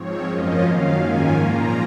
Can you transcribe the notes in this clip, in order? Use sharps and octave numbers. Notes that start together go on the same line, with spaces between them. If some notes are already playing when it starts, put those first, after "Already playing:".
Already playing: G#2 F3 C4 C#5
F#2 F3 A#3 C#4 F4 D#5
F#2 D#3 F#3 F5
G#2 D#3 A#3 C#4 F4 G#5
A#2 F3 A#3 F4 A#5